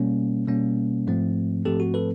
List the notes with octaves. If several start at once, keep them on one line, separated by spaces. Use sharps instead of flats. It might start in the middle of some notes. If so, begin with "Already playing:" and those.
Already playing: B2 G3 A#3 C#4
B2 G3 A#3 C#4
G#2 F3 A3 C4
G#2 F3 A3 C4 G4 A4
F#4
A4 B4